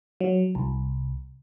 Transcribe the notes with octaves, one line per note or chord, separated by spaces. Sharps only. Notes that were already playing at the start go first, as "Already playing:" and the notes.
F#3
C2